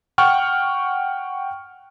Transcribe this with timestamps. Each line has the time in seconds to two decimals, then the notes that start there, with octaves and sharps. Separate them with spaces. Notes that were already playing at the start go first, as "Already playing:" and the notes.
0.18 F#5 G5 C#6 F6